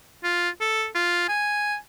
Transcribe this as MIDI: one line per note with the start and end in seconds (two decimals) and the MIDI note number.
0.24 0.50 65
0.61 0.87 69
0.95 1.28 65
1.29 1.76 80